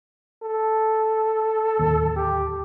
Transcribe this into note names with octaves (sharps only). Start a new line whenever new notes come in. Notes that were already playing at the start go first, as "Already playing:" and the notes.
A4
D1 D#2
G4